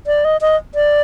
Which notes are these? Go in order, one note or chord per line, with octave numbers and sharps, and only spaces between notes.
D5
D#5
D#5
D5